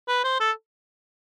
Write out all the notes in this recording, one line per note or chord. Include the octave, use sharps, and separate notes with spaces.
B4
C5
A4